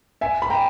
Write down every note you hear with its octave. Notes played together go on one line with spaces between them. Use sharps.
E5 G#5
B5
G5 A#5